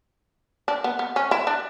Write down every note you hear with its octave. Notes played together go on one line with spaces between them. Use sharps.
D4
B3
B3
C#4
E4
D4